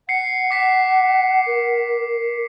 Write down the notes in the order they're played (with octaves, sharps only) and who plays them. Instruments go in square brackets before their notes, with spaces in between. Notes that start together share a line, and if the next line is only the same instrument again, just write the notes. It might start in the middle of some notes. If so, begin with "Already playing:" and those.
[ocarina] F#5 [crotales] C7 C#7
[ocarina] F#5 [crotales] D6 B6 C7
[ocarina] A#4